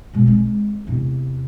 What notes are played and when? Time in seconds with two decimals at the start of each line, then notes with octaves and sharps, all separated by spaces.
0.13 B2 G#3
0.26 G#3 C4
0.87 E2 C3